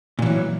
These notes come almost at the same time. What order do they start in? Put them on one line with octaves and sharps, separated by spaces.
A#2 E3 F#3